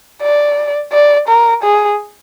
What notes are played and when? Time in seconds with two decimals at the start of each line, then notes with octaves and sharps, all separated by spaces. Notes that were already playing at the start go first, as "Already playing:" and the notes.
0.22 D5
0.92 D5
1.29 A#4
1.63 G#4